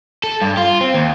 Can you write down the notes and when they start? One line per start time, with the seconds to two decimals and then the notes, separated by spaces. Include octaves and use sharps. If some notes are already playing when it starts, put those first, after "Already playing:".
0.24 A4
0.41 G2
0.57 F4
0.81 C4
0.94 D#2